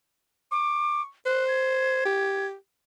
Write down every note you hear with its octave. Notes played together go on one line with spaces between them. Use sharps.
C#6 D6
C5 F#6
G#6
G4